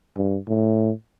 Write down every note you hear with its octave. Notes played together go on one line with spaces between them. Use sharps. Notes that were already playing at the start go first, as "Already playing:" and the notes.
G2
A2